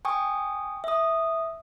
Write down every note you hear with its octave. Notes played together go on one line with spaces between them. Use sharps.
G5 G#5 C#6 D#6
E5 D#6